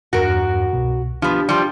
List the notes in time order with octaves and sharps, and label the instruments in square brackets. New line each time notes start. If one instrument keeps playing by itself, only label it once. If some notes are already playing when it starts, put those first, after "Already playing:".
[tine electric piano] E2 G2 [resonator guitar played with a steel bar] F#4 A#4
[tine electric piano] C2 B2
[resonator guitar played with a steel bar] F3 B3 [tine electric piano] D4 G4
[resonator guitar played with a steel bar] F3 G3